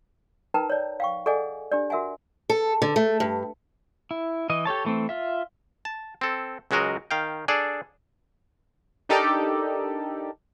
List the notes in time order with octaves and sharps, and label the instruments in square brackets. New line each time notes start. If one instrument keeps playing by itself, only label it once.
[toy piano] D#4 A#4 B4 G5 A5 A#5
C#5 D5
F5 G5 C#6
G#4 A4 D5 D#5 F#5 G#5
D4 G4 D5
F#4 A#4 E5 F#5 G#5
[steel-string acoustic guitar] A4
D3
A3
G2
[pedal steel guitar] E4
E3 D#5
G4 A4 C#5 A5
E3 A3 C4
F4 E5
[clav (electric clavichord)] A5
C4 A4
C#2 F#3 G#3 F#4 A#4 D#5
D#3 F5 G5
D4 G#4 A4 D5
[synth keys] D4 D#4 G4 A4 A#4 D5